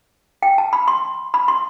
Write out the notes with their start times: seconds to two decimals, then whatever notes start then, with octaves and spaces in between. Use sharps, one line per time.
0.42 G5
0.58 A5
0.73 B5
0.88 C6
1.34 B5
1.48 C6